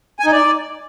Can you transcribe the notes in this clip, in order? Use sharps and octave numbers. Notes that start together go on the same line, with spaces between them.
G#5
D#4
D5